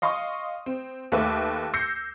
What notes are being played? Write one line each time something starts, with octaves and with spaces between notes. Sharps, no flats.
D#5 F5 C6 C#6 D#6
C4
D#2 A3 B4 E5 D6
E6 G6 A#6 C7 C#7